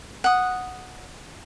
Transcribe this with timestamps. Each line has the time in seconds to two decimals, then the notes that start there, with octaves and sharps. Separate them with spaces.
0.24 F#5 D#6